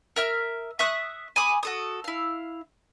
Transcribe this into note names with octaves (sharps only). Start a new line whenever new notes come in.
A#4 E5 F6
E5 C#6 D#6 F#6
G#5 B5 D6 D#6
F#4 A4 D#6
E4 F5